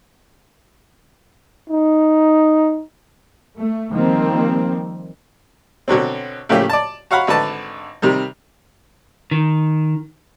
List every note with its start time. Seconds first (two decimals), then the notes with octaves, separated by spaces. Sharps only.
1.70 D#4
3.58 A3
3.90 D#3 F3 G3 A#3 C4
5.88 B2 D3 F#3 C4
6.49 A2 C#3 F3 A3 A#3 G4
6.69 D5 A5
7.11 F#4 C#5 F5 F#5 B5
7.27 G#1 D3 B4 A5
8.02 C3 D#3 G3
9.31 D#3